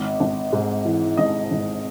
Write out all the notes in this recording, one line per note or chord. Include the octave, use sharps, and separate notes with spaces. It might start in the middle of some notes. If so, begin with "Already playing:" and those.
Already playing: G#1
G#1
G#2
E3
G#1 D#5
G#1